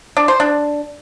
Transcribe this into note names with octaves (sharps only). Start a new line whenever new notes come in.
D4
C5
D4